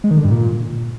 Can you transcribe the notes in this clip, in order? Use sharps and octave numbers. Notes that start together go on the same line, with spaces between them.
G#3
D#3
D3
G2
A#2